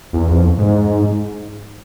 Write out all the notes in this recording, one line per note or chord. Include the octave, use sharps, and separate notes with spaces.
E2
F2
G#2